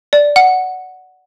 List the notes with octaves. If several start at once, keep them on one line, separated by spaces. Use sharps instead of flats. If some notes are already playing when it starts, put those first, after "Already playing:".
D5
F#5